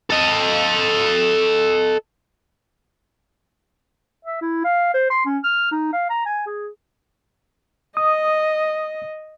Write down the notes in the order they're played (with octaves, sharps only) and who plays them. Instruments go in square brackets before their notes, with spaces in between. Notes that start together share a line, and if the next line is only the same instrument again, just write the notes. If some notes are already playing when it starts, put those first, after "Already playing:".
[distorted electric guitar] A4 D#5
[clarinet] E5
E4
F5
C5
C6
C#4
F6
D#4
F5
A#5
G#5
G#4
[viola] D#5 [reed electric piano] D#6